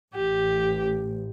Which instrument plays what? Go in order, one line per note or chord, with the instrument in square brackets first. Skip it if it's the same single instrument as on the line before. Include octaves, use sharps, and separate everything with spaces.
[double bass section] A1 [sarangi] G4